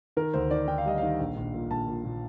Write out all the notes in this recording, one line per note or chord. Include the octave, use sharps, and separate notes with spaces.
D#3 A#4
D2 C5
D#3 D5
D#3 G5
F5
G3 D#5
D#3 F5
A#1
A#1
A#2
A#1 A5
A#2
A#2